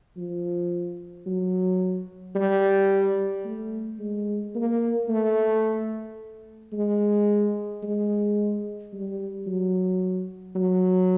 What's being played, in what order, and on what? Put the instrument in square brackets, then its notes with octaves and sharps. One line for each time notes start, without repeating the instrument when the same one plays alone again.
[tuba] F3
F#3
G3
A3
G#3
A#3
A3
G#3
G#3
G3
F#3
F#3